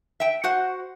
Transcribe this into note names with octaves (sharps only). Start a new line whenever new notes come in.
E5 G5
F#4 C5 F#5